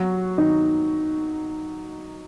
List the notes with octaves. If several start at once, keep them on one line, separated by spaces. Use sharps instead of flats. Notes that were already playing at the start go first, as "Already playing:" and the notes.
Already playing: F#3 F#4
D#3 D#4